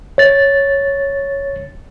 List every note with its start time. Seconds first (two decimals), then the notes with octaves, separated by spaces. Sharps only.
0.18 C#5 A6